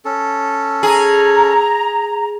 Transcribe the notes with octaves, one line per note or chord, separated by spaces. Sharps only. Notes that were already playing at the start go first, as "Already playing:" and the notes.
C#4 A4
G#4 A#5